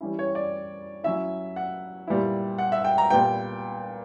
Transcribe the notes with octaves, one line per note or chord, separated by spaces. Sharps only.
E3 G3 C#4 E4
C#5
D5
F#3 C#4 E4 E5
F#5
A#2 G3 B3 E4
F#5
E5
G5
A#5
A#2 G3 B3 G5